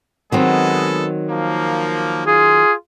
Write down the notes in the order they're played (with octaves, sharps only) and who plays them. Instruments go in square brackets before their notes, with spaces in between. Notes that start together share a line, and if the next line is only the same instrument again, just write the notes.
[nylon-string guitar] D#3 F#3 C4 [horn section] G#3 B3 A4
[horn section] F3 A#3
[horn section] F4 [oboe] G#4